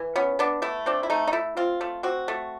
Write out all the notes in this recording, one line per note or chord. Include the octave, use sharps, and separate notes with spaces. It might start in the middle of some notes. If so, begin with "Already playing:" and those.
Already playing: E3
B3 C#4
B3 D4
A3 E4
C4 D4
E4
A3 D#4
D#4
A3 E4
C4 F4
A3
C4 F#4
A3